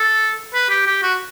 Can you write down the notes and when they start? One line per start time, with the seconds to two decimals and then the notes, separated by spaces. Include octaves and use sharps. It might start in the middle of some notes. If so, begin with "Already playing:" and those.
Already playing: A4
0.54 B4
0.70 G4
0.87 G4
1.02 F#4